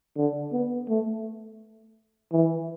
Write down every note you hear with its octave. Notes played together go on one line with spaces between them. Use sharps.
D3
B3
A3
E3